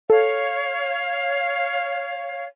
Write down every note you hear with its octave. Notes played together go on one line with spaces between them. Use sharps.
A4 C#5 F5